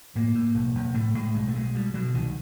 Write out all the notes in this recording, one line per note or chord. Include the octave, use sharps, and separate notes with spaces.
A2 A#3
A2
B1
B1
A2 A3
A2 G#3
B1 G#3
A3
B1 G#3
B2 G3
B2 F#3
C2 D#3